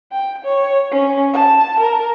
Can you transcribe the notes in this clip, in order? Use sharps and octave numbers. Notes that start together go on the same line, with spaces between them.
G5
C#5
C#4
A5
A#4